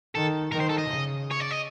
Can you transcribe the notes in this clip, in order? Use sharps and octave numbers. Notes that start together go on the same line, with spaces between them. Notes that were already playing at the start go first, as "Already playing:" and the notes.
D#3 A4
D#3 A#4
C5
A4
D#5
C#3
C#5
D5
D#5